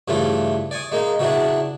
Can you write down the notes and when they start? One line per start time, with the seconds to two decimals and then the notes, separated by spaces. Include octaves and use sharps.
0.08 G2 C#3 E3 A3 F4
0.71 D5 G#5 C#6 D#6
0.92 G#3 A#3 D#4
1.19 C#3 F#3 B3 D4 E4